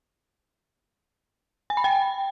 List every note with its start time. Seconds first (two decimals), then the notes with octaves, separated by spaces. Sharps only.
1.70 G#5
1.77 B5
1.84 G5